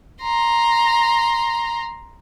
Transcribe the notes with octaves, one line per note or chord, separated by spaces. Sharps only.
A#5 C6